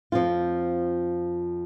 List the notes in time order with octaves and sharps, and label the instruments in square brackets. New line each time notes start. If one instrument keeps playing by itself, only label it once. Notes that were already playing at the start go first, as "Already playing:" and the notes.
[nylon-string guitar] F2 F3 C4 F4